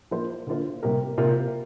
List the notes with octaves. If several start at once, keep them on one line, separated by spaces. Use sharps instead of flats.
F3 A#3 F4 C5
D3 A#3 F4 C5
C3 G3 A#3 G4 A#4
C3 A#3 F4 A#4